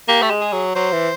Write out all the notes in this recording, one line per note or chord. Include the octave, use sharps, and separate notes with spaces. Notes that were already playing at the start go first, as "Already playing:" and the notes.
A#3 G4
A3
G#3
G#4
F#3
F#3 C5
E3